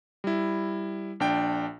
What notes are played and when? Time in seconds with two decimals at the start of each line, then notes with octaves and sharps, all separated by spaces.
0.24 G3 E4
1.20 A#1 D4 G5